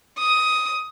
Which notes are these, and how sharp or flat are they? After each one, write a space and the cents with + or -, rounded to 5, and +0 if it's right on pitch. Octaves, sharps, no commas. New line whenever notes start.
D#6 +10